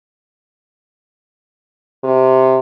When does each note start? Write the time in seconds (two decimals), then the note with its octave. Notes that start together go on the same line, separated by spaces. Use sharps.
2.04 C3